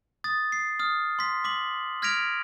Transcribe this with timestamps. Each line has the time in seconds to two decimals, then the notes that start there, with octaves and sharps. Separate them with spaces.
0.24 D#6 A6
0.52 C7
0.79 D#6 F6
1.19 C6 B6
1.44 D6 B6 F#7
2.02 F6 G#6 A#6 B6 D7 F7